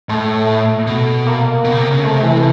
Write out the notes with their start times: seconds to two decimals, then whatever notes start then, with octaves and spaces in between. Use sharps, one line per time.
0.09 A2 A3
0.87 B2
1.26 A#3
1.65 B2
1.72 C#3
1.78 C3
1.91 C#3
2.03 C3 A3
2.23 E3